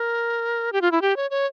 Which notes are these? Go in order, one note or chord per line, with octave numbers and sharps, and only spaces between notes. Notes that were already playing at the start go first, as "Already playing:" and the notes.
Already playing: A#4
G4
F4
E4
G4
C#5
C#5